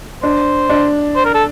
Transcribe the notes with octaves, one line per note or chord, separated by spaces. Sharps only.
D4 C5
D4
C5
A#4
A4